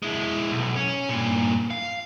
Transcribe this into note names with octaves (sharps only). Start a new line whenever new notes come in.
G#3 E4
B1
C#4
G2 A#2
F5